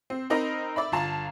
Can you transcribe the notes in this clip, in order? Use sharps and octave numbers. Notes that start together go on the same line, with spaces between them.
C4
C4 D#4 A#4 D#5 A#5 B5
D5 E5 B5
G1 F4 A5 A#5 A6